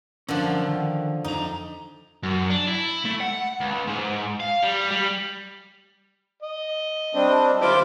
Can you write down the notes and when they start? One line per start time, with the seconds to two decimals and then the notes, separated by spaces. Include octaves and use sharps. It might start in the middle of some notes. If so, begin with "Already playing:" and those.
0.28 D3 F3 C#4 A#4 F#5
0.68 D#3
1.24 F2 D#4 A#5
2.23 F#2
2.50 D4
2.67 E4
3.05 A3
3.20 F#5
3.61 C#2
3.88 G#2
4.40 F5
4.62 G3
4.91 G3
6.42 D#5
7.15 G3 C4 D4
7.61 D#2 E4 F4 C5 D6